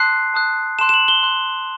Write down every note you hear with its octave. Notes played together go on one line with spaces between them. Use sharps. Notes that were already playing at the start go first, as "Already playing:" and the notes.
Already playing: A5 C6 D#6 F#6 C7
A5 D#6 F#6
A5 C6 F#6 E7
E7
F#7
G7
C6 F#6